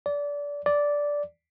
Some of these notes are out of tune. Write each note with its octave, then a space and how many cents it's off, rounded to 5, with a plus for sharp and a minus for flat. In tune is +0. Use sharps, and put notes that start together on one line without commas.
D5 -25
D5 -10